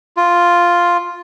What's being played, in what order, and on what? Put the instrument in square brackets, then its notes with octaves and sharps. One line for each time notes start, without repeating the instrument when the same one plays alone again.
[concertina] F4